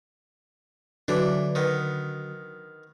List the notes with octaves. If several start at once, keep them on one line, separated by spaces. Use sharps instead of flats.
D3 E3 F#3 D4
D#3 B3